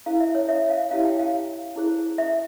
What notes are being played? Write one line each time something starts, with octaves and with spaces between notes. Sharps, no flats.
E4 G#4 C5 F5
E5
C#5
E5
F5
E4 G4 C#5 F5
G5
F5
E4 G#4 C5
E5